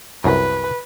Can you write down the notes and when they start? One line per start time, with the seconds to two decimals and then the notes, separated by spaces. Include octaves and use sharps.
0.24 C2 F#2 B4